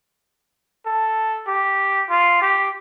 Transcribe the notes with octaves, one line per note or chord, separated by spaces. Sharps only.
A4
G4
F4
G4